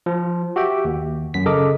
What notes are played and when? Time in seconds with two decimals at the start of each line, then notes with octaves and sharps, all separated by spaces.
0.06 F3
0.56 F#4 G4 E5 G5
0.85 D#2
1.34 F#2 B6
1.46 C#3 A4 A#4 D#5 D6